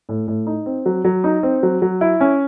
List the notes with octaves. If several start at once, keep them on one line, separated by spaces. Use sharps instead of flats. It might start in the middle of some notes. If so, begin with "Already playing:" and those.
A2
A2
D#4
C4
F#3
F#3
D#4
C4
F#3
F#3
E4
C#4